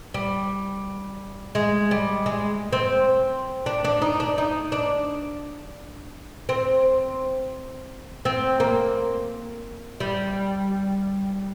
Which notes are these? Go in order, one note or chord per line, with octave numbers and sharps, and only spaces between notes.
G3
G#3
G3
G#3
C4
D4
D4
D#4
D4
D#4
D4
C4
C4
A#3
G3